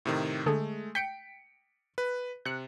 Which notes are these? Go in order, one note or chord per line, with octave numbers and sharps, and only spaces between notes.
A2 C3 D#3
D3 G#3 A3 G#4 A4
G5 B6 C#7 D7
B4
C3 F#6 C#7